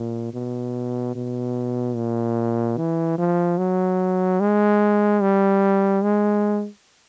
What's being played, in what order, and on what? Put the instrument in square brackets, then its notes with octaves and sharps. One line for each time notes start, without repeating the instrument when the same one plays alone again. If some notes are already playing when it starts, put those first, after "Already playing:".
Already playing: [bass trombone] A#2
B2
B2
A#2
E3
F3
F#3
G#3
G3
G#3